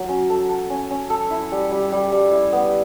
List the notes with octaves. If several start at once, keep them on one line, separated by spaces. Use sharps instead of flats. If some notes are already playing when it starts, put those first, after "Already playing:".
Already playing: F#3
C#4
A4
A4
C#4
C#4
A4
E4
G3
G3
G3
G3
E4
B3